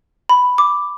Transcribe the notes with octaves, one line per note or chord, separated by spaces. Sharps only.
B5
D6